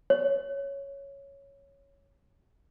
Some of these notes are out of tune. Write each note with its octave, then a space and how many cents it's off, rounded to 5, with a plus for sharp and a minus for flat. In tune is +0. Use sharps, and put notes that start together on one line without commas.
C#5 +0